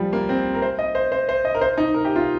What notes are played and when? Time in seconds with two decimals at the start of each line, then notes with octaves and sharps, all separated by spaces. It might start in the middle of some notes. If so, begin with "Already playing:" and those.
Already playing: F3 G3
0.13 A#3
0.29 C4
0.55 A#4
0.62 C5
0.79 D#5
0.95 C5
1.12 C5
1.29 C5
1.45 D#5
1.55 A#4
1.61 C5
1.77 D#4
1.94 A#4
2.05 G4
2.16 F4